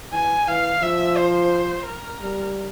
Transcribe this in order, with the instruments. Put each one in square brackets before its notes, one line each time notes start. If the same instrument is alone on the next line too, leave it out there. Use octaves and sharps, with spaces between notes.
[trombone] E3 [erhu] G#5
[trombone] E3 [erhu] F5
[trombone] F3 [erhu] E5
[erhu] C5
A#4
[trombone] G3